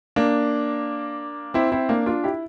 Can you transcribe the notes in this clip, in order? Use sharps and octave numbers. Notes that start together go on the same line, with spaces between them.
A#3 D4
C4 E4
C4 E4
A#3 D4
D4 F4
E4 G4